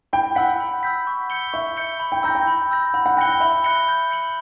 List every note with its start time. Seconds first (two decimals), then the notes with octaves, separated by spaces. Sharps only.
0.13 G5 B5
0.35 F#5 E6 G6 B6
0.60 B5
0.83 E6 G6 B6
1.07 C#6
1.30 G6 C#7 G7
1.53 E5 C#6
1.77 G6 C#7 G7
2.00 B5
2.12 G5
2.23 A#5 E6 G6 A#6
2.35 G5
2.47 B5
2.71 E6 G6 A#6
2.94 F#5 B5
3.06 F#5
3.17 G5 F#6 A#6 C#7 G7
3.29 G5
3.40 E5 B5
3.64 F#6 A#6 C#7 G7
3.88 G6
4.11 C#7 F#7